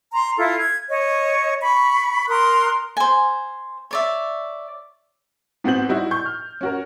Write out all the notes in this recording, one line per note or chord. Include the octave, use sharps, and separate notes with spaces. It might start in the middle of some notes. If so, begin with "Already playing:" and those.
A#5 C6
E4 F4 A4
G#6
C#5 D#5
B5 C#6
A#4 C6 D#6 F#6
C5 G#5
C#5 D5 E5
G#2 B3 C4 F#4 G6 F#7
G3 D#4 E4 F#4
C#6 G6
F6
C#4 F#4 A#4